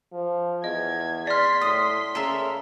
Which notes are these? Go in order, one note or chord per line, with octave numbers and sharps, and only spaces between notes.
F3
E2 D#5 G#6
D5 C6 F6 B6
A2 C6 D#6 B6
C#3 A4 A#4 E5